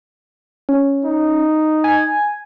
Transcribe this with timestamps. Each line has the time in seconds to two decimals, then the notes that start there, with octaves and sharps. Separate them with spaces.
0.69 C#4
1.05 D#4
1.84 G#5